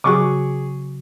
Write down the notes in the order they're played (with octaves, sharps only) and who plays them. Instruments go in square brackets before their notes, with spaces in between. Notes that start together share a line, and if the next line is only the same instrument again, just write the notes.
[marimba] C#3 F#3 F#4 [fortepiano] G#4 C#6 D6